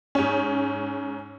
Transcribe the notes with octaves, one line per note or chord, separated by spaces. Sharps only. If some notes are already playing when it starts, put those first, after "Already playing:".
G#2 C#4